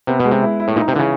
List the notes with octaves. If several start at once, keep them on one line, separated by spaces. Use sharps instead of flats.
C3 B3
B2
G#3
C3
E4
E4
A2
A#2 D#4
C3
D3 E3
C#3